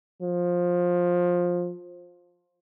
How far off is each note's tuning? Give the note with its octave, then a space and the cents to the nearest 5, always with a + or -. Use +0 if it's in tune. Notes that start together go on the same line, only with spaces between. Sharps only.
F3 +15